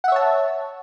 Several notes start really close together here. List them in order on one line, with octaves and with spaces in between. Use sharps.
F#5 E5 C#5 A5